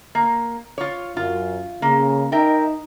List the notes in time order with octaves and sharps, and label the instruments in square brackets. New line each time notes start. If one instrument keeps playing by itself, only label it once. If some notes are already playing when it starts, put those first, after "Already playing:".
[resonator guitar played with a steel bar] A#3
F4 C#5
[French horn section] F#2 [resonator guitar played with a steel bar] F4
[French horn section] C#3 [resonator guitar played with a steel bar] A#3
[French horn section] D#4 [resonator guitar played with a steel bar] A#4 E5 G5